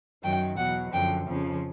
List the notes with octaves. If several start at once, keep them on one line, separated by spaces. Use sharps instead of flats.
F#2 D#3 F#3 G5
E2 B2 F#3 F#5
F#2 D3 F3 G5
F2 C#3 F3